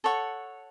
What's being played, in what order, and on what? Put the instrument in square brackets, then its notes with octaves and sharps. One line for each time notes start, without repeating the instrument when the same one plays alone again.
[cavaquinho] A4 C#5 F#5 C#6